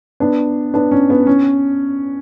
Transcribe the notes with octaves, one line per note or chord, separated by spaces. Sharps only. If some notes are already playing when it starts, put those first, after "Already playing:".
B3 D4
B3 D4
C#4
B3
C#4